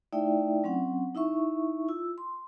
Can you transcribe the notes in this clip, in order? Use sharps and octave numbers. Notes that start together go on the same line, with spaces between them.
A3 D#4 E4 D5 E5 G5
F#3 C4 C#4 F#5
D#4 E4 E5 C#6
F4 E6
C6